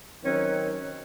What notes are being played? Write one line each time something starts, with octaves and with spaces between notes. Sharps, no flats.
D#3 F#3 C4 C#4